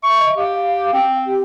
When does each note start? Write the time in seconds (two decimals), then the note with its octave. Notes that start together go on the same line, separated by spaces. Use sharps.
0.03 E5 C#6
0.19 D#5
0.36 G4 F5
0.93 C4
1.26 G4